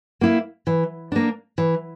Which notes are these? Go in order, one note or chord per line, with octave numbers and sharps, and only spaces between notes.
A#3 E4
E3
A#3 D4
E3